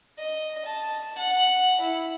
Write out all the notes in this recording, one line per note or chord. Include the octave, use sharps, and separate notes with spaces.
D#5
A5
F#5
E4